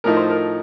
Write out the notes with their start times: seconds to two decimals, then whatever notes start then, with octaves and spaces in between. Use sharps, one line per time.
0.04 A2 F3 A3 D#4 A#4
0.16 C5
0.30 A#4